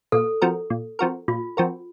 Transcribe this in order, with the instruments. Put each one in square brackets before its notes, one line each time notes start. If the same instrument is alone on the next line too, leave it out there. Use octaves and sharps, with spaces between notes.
[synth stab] A#2 [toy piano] A4
[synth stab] F3 C4 F#4 A#4
A#2
F3 C4 F#4 A#4
[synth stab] A#2 [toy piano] F4
[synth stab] F3 C4 F#4 A#4